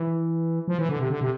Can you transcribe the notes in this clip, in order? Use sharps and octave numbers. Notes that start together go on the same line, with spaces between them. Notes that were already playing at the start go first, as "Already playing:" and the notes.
Already playing: E3
F3
E3
D3
C3
D3
C3